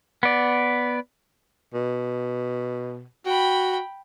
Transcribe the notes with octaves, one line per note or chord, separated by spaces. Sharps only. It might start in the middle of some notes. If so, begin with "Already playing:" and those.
B3 D5
B2
F#4 G5 B5